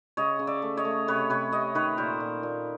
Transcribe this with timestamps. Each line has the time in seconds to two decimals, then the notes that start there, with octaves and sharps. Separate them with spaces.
0.17 C#3 C#5 D#5
0.39 C#3
0.47 D5 E5
0.62 A3
0.77 C#5 D#5
0.85 A3
1.08 C3 B4 C#5
1.30 C3 B4 C#5
1.52 C3 C#5 D#5
1.75 D#3 B4 C#5
1.97 A#2 A#4 C5
2.20 A#2
2.43 A#2